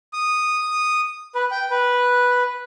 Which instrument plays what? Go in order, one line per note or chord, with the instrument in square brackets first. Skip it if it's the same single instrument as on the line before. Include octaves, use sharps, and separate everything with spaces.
[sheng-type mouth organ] D#6
B4
G5
B4